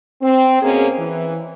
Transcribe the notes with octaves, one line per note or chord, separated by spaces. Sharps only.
C4
B2 A#3 C#4 G#4
E3